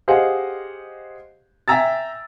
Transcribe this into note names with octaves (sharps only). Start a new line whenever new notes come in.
G4 G#4 C5 D#5 F5 F#5
E5 G5 G#5 A#5 E6 A6